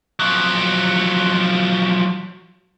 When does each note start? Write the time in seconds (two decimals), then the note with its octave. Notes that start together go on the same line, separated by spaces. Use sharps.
0.19 F3 F#3